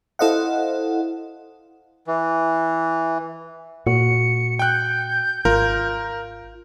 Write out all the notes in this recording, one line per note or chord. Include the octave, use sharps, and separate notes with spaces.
E4 A4 C5 D#5 F5 F#5
E3
A#2 F#4 C#7
G5 F#6 G6
G#1 F4 A#4